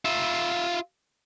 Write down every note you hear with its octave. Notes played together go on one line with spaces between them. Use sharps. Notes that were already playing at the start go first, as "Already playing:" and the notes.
F4 E5